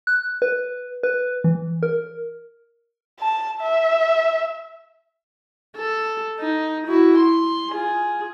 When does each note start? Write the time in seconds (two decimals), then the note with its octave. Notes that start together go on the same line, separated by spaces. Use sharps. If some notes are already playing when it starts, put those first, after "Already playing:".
0.07 F#6
0.42 B4
1.03 B4
1.44 E3
1.83 A#4
3.20 A5
3.61 E5
5.76 A4
6.39 D#4
6.86 E4 F#4
7.17 C6
7.70 F4 G#4